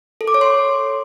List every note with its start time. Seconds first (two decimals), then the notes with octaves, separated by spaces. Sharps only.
0.21 A4
0.28 D6
0.34 C#5
0.41 C6